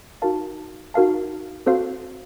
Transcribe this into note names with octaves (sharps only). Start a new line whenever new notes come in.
D#4 F#4 A#4 F5 A5
D#4 F#4 A#4 F5 A5
C4 F#4 A4 C5 F5